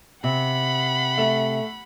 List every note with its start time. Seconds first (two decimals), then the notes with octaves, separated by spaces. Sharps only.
0.24 C3 F#5 B5
1.17 A3